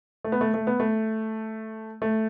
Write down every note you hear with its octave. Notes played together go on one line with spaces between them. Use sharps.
A3
B3
A3
A3
B3
A3
A3